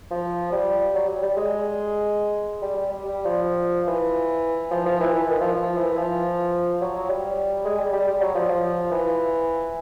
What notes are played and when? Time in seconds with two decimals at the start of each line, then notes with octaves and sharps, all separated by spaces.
0.11 F3
0.52 G3
0.95 F#3
1.08 G3
1.23 G3
1.37 G#3
2.62 G3
2.76 G3
2.90 G3
3.05 G3
3.25 F3
3.88 E3
4.71 F3
4.86 F3
5.00 E3
5.14 E3
5.28 D#3
5.41 F3
5.55 F3
5.77 E3
5.97 F3
6.81 F#3
6.96 F#3
7.10 G3
7.65 G#3
7.79 G3
7.93 G3
8.08 G3
8.21 F#3
8.35 F3
8.49 F3
8.92 E3